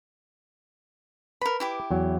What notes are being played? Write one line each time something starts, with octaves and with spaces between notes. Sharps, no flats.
A#4 B4 B5
E4 G4 D6
E2 F#3